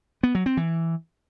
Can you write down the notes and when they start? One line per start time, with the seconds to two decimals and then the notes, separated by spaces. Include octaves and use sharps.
0.23 B3
0.35 F#3
0.46 C4
0.57 E3